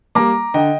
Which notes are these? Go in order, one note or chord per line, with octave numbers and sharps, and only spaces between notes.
G3 A#3 A#5 D6
D3 D#5 G5